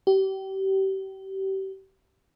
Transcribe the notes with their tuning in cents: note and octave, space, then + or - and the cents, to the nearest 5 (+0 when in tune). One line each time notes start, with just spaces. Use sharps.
G4 -30